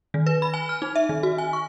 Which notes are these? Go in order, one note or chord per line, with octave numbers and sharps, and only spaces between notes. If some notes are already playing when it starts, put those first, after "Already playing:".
D#3
B4
B5
G#5
F6
D#4
E5
D#3
F#4
G#5
C#6